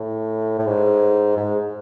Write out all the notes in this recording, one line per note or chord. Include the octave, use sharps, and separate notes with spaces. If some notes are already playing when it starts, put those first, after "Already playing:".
Already playing: A2
A2
G#2
G#2